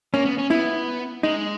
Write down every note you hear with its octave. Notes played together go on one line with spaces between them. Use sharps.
A#3 C#4
B3
C#4
B3 E4
G#3 D#4